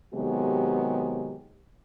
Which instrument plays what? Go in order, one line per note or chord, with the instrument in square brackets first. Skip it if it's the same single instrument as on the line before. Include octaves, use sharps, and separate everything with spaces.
[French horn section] C3 D#3 F#3 G#3 B3 G4